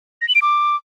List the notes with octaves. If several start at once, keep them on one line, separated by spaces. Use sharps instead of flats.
A#6
F#7
D7
D6